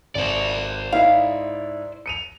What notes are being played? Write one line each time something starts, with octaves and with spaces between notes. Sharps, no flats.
G#1 C5 D5
G#2 E4 D#5 F5
C#7 D#7 F7